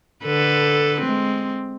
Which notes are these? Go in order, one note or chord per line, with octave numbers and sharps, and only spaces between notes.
D3 A4 B4
G#3 C4